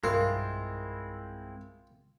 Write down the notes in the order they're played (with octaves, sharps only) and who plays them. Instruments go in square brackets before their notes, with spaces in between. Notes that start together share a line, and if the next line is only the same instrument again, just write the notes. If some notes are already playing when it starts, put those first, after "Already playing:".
[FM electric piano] B1 G2 [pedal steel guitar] G#3 C4 E4 [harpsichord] F4 [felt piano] A#4